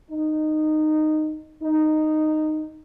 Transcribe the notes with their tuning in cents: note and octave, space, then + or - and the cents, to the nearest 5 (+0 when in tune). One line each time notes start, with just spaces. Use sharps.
D#4 -15
D#4 -10